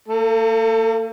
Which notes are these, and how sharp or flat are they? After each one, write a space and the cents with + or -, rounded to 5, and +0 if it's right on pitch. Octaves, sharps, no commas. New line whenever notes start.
A#3 -40 A4 +25